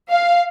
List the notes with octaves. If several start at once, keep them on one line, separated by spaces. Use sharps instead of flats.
F5